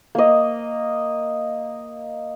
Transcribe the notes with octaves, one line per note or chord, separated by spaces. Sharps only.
A#3 D#5